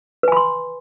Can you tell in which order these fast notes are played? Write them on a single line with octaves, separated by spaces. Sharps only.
B4 G#5 B5 C6